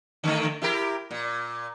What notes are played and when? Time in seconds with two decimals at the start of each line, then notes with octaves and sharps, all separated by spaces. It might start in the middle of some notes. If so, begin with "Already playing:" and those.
0.24 D3 D#3 A3
0.62 E4 G4 A#4
1.11 A#2